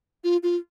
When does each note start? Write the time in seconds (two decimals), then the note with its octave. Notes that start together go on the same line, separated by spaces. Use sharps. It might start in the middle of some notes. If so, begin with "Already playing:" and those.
0.24 F4
0.43 F4